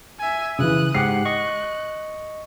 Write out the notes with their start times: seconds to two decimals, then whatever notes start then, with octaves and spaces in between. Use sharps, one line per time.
0.20 E5 G#5
0.59 C#3 E3 D#6 F#6
0.95 G#2 G4 F#5 F#6 C7
1.25 D#5 C#6